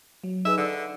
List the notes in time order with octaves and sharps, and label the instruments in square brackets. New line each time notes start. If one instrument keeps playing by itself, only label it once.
[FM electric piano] F#3
[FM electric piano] D#4 G#4 B4 [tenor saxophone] E5
[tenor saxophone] D3 [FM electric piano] D#5